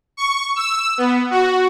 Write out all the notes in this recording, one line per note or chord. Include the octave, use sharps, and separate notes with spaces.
C#6
E6
B3
F#4